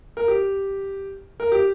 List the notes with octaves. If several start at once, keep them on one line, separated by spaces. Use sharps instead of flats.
A#4
G4
A#4
G4